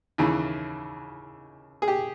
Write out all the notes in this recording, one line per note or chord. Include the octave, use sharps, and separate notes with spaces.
D#2 C#3 E3
G#4
G4